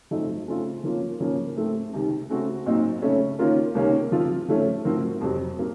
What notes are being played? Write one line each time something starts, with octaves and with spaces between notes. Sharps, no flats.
F#2 F3 A3 C4 D#4
C#3 A3 C4 F4
F3 A#3 C#4 F4
C#3 F3 A#3 C#4
A2 A3 C4
C#2 C3 D#3
C#3 A3 C4 F#4
A#2 F#3 C4 D#4 F#4
C#3 A3 C#4
D#3 A#3 C#4 F4 A#4
C#2 C3 D#3 A#3 C#4
F3 C4 F4
F3 A3 C#4
A2 F3 C4 F#4 A#4
F2 C3 F#3
A#2 F#3 A#3